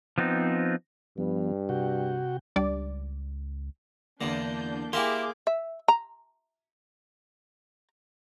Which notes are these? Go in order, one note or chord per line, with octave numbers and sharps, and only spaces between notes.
F3 B3 C4 D#4
G2 F3 B3
C3 F#4 G5
C#2 G3 D4 D5
E2 D3 A#3 D4 G6
A#3 E4 G4 G#4 E5 C6 D6
E5
A#5